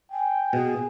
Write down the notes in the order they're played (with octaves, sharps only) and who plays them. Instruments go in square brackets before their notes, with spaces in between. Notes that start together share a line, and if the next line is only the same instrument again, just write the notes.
[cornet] G5 [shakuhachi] G#5
[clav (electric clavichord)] B2 [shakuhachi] G#4